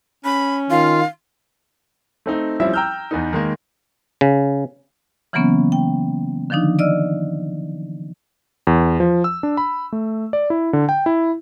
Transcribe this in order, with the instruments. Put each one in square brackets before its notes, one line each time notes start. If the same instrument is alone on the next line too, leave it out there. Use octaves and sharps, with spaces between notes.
[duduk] C#4 [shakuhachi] B5
[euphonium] D#3 [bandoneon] F4 [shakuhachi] F5
[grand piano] A3 C4 D#4
F3 G3 C4 C#4 E4 E5
G5 A#5 E6 F6 G6
E2 B3 D#4
D#3 G#3 A#3
[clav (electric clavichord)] C#3
[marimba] C#3 E3 F#3 A#3 B3 C#4
G5
D3 D#3 F3 D4 D#4
D5 D#5 E6 F6
[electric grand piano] E2
F3
E6
D4
B5
A3
D5
E4
D3
G5
E4